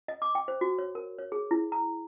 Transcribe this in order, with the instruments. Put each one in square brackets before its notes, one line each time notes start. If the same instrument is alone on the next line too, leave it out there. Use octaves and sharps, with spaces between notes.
[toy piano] D#5
D6
G5
C5
F#4
C#5
A#4
C#5
G#4
E4
A#5